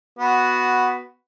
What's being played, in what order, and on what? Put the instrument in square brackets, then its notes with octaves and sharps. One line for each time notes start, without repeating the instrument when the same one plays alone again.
[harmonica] B3 F#4